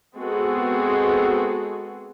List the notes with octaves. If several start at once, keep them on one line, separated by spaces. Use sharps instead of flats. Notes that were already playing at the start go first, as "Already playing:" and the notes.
G#3 B3 C4 F#4 G#4 A4